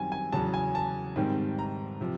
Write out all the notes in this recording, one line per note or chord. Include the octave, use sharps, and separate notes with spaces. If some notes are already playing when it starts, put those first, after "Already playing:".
Already playing: F#2 D#3 G3 C4 G#5
G#5
E2 C#3 F#3 A5
G#5
A5
G#2 D#3 G3 C4
A#5
C3 F3